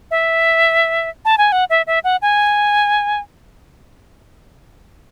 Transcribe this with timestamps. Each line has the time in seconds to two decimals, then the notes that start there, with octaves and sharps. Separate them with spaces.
0.11 E5
1.25 A5
1.38 G#5
1.52 F#5
1.70 E5
1.87 E5
2.04 F#5
2.22 G#5